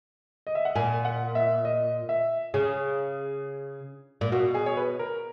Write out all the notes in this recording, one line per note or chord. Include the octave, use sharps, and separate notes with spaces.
D#5
E5
F#5
A#2 G#5
F#5
E5
D#5
E5
C#3 G#4
A#2
B2 F#4
G#4
C#5
B4
A#4